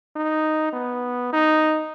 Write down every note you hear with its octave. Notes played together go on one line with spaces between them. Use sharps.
D#4
B3
D#4